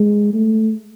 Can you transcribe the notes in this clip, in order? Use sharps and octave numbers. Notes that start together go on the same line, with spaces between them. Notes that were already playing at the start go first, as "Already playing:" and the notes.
Already playing: G#3
A3